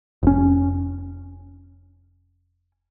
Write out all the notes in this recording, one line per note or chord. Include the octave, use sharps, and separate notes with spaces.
F1 C#4